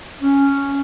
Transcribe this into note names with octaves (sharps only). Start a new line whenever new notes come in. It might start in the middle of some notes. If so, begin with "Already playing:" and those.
C#4